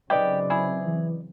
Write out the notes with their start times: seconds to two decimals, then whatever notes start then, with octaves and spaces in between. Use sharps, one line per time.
0.10 C#3 F#3 C4 D#4 G4 B4 D5
0.50 E4 G#4
0.85 E3